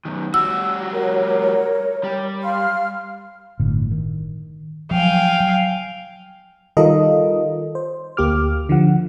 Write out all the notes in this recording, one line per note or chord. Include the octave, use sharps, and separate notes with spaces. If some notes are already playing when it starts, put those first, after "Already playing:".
F#2 D#3
G3 F#4 E6
A#4 C#5
G3
F5 C6 F6
G1 A2 D3
D#3
F3 F#3 F5 G5 G#5
F#3
D#3 G3 F4 A4 A#4 D#5
C5
D2 A#3 G4 D6 F6
D3 F3 F#5